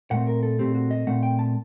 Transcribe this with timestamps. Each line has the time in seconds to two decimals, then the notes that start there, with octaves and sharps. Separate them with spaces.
0.11 A#2 A3 C4 F#5
0.27 A#4
0.43 A4
0.59 A#2 A3 C4 G4
0.75 F#4
0.91 D#5
1.07 A#2 A3 C4 F#5
1.23 G5
1.39 A5